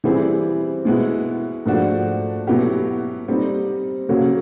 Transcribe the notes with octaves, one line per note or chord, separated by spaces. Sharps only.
E3 G3 C4 E4 G#4
B2 G#3 B3 E4
G#2 F3 A3 D4 F#4
B2 F#3 B3 E4 G4
G3 C4 D#4
C#3 F#3 A#3 C#4 F#4